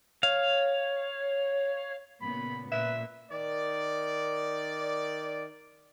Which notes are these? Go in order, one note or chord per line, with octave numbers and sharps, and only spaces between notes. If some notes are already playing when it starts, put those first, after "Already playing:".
C#5 F5
A#2 C#3 B3 B5
A#2 B4 E5
D#3 D5